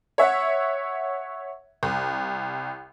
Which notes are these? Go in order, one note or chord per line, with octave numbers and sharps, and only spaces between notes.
C#5 E5 F#5
C2